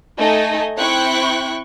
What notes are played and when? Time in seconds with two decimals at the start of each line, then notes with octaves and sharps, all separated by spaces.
0.19 A3 D#4 A4 D#5 G#5
0.79 C4 E4 G5 C#6 F#6